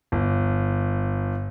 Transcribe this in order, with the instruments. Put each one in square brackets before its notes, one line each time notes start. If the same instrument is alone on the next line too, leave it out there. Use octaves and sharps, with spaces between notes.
[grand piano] G1